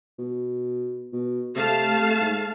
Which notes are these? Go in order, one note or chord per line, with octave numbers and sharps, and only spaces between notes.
B2
B2
C3 A3 F5 A5
G#2